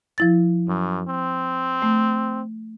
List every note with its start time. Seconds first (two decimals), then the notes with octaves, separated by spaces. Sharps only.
0.18 F3 E4 A6
0.68 F#2
1.08 C4
1.82 A3